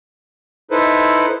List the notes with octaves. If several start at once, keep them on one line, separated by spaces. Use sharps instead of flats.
D#4 E4 A4 B4 C5